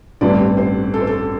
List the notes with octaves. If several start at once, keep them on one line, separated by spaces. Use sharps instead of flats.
A1 G2 D3 C4 D5
C5
A4
C5
A4